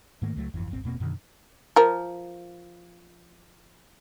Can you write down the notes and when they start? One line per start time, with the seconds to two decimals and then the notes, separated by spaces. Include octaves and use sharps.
0.22 G#2 D#3 A3 A#3
0.36 C#2 F#3 A3
0.54 G1 F2 E3
0.71 D#1 G#1 C4
0.84 E1 B2 A#3 C4
1.00 F#2 B2 D3 D#3
1.76 F3 A#4